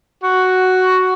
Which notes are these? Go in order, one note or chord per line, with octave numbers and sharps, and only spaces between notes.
F#4